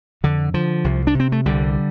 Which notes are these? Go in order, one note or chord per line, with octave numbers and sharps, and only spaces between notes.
F2 D3
D3 F3
C2
D4
C3
C4
A3
C2 D3 G3